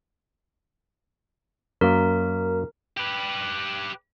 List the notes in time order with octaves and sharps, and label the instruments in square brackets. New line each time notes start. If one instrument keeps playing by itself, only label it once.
[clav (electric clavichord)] F#2 A#3 [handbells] A#4
[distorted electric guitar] G4 B4